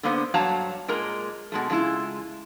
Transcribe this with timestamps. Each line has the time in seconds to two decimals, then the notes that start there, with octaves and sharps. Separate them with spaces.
0.03 D3 A#3 B3 C5
0.34 G2 F#3 C#5 F5 A5 A#5
0.88 A#2 G#3 A#4 A#5
1.52 B2 G#3 A3
1.70 C#3 F#3 G#3 E4 F4